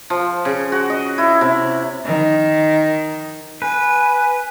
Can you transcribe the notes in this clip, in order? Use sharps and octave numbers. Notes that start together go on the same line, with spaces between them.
F3
C#3
F#4
D#5
E4
C3
D#3
B4 G#5